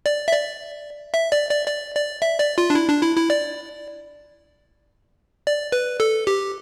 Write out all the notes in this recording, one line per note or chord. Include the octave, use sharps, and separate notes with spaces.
D5
E5
D5
E5
D5
D5
D5
D5
E5
D5
F4
D4
E4
D4
E4
E4
D5
D5
B4
A4
G4